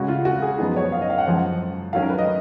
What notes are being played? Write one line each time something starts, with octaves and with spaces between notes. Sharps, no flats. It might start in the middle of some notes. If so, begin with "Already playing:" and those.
Already playing: C#3 G#3 C#4 F#4
F4
F#4
G#4
F#2 F3 B3 D#4 G#4
C#5
F5
D#5
F5
F#5
F#2 F3 G#3 C#4
D#3 F#3 C#4 F5
A#4
B4
D#5